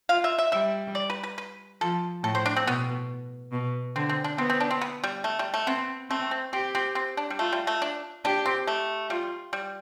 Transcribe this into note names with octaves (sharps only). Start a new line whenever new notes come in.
F4 F5
E5
E5
G3 E5
D5
B4
B4
B4
F3 A4
A2 A4
C5
D4
C4
B2 B3
B2
D3 C4
C4
D4
B3 C4
C4
D4
C4
B3
G3
A3
G3
A3
B3 C4
A3 C4
C4
C4 G4
C4
C4
D4
G3
A3 F4
G3
A3
D4
D4 G4
C4
A3
G3 F4
G3